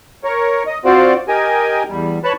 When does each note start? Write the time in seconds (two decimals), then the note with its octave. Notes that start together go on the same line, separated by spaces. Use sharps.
0.24 A#4 C#5
0.67 D#5
0.85 C4 F4 F#4 C5 D5
1.28 G4 A#4 D#5 G5 G#5
1.89 E2 G3
2.24 B4 C#5 A5 B5 F#6